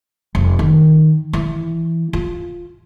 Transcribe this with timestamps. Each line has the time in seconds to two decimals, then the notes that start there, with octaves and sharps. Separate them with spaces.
0.35 F1
0.59 D#3
1.33 E3
2.13 F4